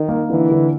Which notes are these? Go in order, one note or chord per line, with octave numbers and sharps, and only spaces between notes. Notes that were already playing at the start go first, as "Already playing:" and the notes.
Already playing: D#3
A#3
D3 E3
D3